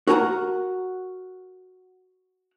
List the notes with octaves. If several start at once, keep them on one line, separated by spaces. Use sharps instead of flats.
F#4 A#4 F#5 G#5 A#5